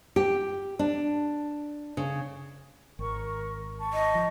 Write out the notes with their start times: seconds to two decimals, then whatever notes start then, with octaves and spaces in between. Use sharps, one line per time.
0.16 G4
0.79 D4
1.97 C#3
2.99 G#1 A#4 C#6
3.78 A5 C#6
3.94 D#5
4.15 F3